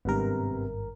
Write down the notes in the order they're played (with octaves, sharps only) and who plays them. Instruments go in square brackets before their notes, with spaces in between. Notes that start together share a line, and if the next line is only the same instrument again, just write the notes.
[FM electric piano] G#1 G2 A#4 [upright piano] C3 G3 B3